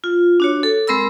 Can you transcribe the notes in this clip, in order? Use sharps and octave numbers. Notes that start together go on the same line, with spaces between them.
F4
D4 F#4 C#5
A4
G#3 C4 A#4 B5 E6